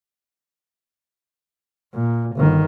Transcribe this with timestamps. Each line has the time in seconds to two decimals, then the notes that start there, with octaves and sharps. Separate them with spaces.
1.95 A#2
2.36 G1 D#3